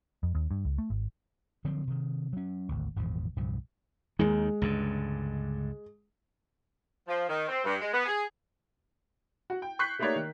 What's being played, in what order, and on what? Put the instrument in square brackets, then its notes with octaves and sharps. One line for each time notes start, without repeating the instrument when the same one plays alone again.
[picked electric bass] F2
D#2
G2
C#2
A3
G#1
[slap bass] D3 F3 F#3 C4
C3 D#3
F#3 C#4
G#1 D2
G#1 E2 A#2 F3
C2 G2 A#2 F3
[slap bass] D#2 D#3 [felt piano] G#3
[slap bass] C#2 G2 D3
[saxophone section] F3
D#3
C4
G2
G#3
B3
G#4
[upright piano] F#4
G5
C#6 F#6 G6 B6 C7
A3 A#3 D#4 G4 C#5 D5
D#3